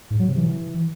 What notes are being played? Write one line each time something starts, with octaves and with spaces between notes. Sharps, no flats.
G#2
F#3
C3
E3